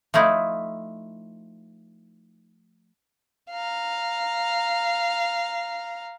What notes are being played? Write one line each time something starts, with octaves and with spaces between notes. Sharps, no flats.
F3 A3 D#4 E4
F5 A#5